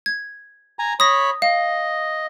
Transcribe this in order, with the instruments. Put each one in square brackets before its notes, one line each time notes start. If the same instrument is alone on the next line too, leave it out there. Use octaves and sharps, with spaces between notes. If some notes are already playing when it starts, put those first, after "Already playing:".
[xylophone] G#6
[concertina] G#5 A#5
[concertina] C#5 B5 [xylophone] D#6 A#6
[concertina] D#5 [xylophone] F5